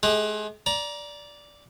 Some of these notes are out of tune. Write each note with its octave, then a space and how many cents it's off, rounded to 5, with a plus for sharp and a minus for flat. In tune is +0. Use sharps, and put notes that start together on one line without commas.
G#3 +35 G#4 -40
D5 -10 A#5 +20